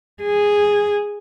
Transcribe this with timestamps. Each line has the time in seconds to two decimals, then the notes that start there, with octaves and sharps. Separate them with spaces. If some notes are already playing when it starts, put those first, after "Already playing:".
0.23 G#4